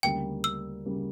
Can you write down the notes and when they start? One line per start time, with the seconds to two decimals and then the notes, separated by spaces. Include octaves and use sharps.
0.03 D2 C#3 G3 A#3 G5
0.44 E6
0.86 C#3 G3 A#3